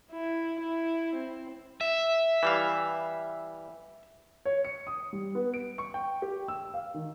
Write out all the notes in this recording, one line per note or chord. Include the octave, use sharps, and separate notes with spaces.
E4
E4
C4
E5
E3 G3 F5
C#5
C#7
D#6
G3
B3
D7
C#6
G5
G4
E6
F5
D#3